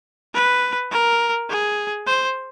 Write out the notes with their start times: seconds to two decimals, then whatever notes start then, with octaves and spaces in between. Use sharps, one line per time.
0.34 B4
0.91 A#4
1.50 G#4
2.06 C5